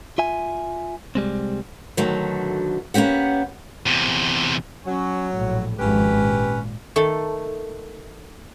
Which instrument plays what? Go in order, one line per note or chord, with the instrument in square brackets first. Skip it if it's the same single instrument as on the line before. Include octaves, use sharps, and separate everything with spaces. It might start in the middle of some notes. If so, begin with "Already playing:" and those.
[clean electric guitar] F4 E5 G#5
C2 G3 G#3 C4
[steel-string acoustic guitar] B2 D3 D#3 F#3 A3
A#3 B3 C#4 G4 F#5
[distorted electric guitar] E2 C3
[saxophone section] F#3 [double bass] C#4
[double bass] A#1 A2
[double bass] G#1 F2 [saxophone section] C#4 G4 B4
[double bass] A#2
[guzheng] D#3 A3 A4